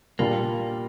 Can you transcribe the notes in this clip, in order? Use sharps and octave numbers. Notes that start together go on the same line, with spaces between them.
A#2 G3 A#3 D4 F4